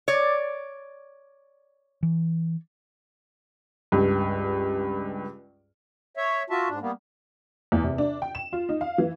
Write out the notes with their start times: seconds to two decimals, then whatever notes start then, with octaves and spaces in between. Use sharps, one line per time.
0.08 C#5 D5
2.03 E3
3.92 C#2 G2
6.17 C#5 E5
6.50 F4 F#4 E5 A5
6.68 G#2 D4
6.81 G3 A#3 B3
7.72 E2
7.83 C3
7.98 D4
8.22 G5
8.35 E7
8.53 F4
8.69 D#4
8.81 F5
8.98 E3